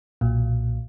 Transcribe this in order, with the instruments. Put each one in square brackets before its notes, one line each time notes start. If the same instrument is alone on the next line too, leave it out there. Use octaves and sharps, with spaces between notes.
[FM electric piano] B1 A#2